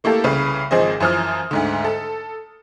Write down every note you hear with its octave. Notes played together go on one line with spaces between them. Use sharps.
A3 A#3 E4 G4 A4
C2 C#3 B4
G#1 F3 C4 G#4 C5 D#5
F#2 E3 F3 D#6 F6
D2 G#2 D3
A4